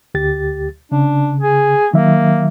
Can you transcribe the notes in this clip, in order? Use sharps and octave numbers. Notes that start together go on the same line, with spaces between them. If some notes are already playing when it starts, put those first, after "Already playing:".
D2 G4 A6
C#3 D4
G#4
D#3 F#3 A#3 E5